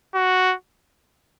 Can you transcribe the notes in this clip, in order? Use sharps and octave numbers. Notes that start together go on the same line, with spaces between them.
F#4